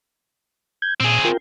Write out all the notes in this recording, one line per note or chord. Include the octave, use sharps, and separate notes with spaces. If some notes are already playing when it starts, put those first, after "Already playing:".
G6 G#6
A#2 C4 G#4
F4 A#4 G5